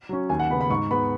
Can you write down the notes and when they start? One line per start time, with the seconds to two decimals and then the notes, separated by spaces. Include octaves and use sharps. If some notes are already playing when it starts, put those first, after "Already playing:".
0.09 F#3 C#4
0.29 D#2 G#5
0.40 F#5
0.50 C#3 B3 B5
0.61 B5
0.70 G#2 C#6
0.91 G#3 B3 B5